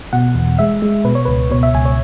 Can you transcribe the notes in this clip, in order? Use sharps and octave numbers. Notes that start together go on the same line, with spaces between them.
B2 F#5
E2
G#3 E5
G#3
B2 B4
C#5
C#2 B4
B2 C#5
E5
C#2 G#5
C#5